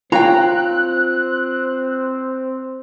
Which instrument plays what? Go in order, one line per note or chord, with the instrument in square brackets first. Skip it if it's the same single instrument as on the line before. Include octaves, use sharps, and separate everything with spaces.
[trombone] C4 [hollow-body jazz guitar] F4 C#5 F5 [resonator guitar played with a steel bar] G5 A#5 [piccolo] F#6